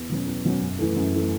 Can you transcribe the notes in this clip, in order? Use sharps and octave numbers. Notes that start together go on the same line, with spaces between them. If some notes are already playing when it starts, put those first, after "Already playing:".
Already playing: E2
B2 F#3 C#4
E2
B2 F#3 C#4
F#2
E3 A3
F#2
E3 A3